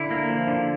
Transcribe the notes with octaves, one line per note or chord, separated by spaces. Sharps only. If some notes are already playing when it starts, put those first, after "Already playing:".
Already playing: D3 E4
A#3
F3
D3